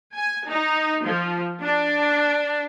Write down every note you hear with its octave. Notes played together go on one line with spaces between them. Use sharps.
G#5
D#4
F3
D4